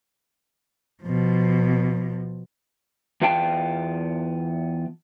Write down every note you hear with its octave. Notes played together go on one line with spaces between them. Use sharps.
B2 F3
E2 B3 F4 F5 G5 A5